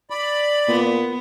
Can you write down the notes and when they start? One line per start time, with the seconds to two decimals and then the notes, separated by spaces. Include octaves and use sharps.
0.10 D5 B5
0.68 A#2 B3